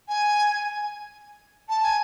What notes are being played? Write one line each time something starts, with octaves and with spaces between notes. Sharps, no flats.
G#5
A5
G#5